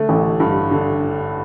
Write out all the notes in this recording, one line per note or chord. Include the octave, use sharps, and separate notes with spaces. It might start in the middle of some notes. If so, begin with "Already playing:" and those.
Already playing: D3 A3
A1
G2
D3